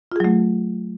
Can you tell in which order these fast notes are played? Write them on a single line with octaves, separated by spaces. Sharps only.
F4 G#4 F#3 A3